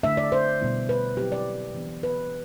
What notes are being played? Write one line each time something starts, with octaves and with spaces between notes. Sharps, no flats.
D3 A3 D4 E5
D5
C5
B2 G3 B3 E4
B4
F#3 C4 E4 G4
D5
E3 B3 D4
B4